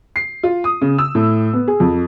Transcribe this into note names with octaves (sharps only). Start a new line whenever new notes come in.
C7
F4
D#6
C#3
E6
A2
B3
G#4
F2